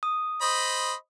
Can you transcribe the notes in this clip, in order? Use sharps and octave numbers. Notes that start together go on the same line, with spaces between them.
D#6
C5 D#5 B5